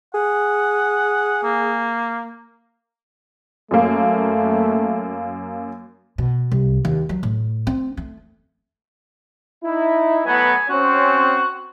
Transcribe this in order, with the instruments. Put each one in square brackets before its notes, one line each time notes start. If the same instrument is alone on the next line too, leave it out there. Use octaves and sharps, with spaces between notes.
[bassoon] G#4 [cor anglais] F#5
[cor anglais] A#3
[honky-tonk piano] F#2 A#3 [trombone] A3
[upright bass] B2
C2
D#2
F#3
A2
C4
A3
[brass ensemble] D#4 E4
[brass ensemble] F#3 A3 B3 [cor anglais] G#5
[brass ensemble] C4 C#4 [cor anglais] F#4